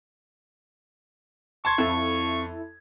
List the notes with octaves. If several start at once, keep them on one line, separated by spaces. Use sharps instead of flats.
A5 C6 C#6 G#6
F2 E4 A4